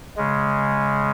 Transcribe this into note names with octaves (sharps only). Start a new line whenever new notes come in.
C#3 G#3